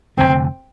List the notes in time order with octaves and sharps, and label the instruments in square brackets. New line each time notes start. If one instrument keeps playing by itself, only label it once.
[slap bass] F1 F2 D3 A3 [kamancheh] C4